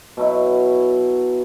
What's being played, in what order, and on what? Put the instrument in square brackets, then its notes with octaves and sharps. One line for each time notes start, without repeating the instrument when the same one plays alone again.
[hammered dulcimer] B2 F#3 E4